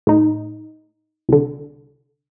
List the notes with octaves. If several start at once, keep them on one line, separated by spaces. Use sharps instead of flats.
A2 D#4
C2 D3